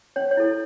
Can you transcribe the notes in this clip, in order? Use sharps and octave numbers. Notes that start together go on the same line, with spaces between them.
C#4 C#5
C#5
E4 A4